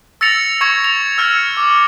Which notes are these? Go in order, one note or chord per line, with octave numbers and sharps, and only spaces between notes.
E6 A6 A#6 C#7 F7
C#6 G#6 C#7
F7
E6 F6 G#6 C#7
D6 E6